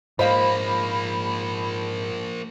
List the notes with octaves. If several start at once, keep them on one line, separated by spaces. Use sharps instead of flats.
G#2 F3 A#3 C5 D#5 F5 B5